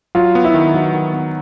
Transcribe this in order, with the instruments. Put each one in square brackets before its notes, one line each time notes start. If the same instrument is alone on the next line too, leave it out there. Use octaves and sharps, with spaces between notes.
[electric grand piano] F#3 [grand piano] F4
[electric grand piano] B3
[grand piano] E4
[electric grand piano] D#3
[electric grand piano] F#3 [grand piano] F#4
[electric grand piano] D#3
B3